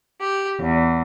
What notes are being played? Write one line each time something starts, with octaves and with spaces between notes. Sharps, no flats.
G4
E2